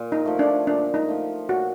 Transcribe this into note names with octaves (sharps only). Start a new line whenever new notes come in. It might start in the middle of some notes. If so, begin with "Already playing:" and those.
Already playing: A#2
D#4
F3 A3
D4
A#2 D4
D#4
F3 A3
A#2 F#4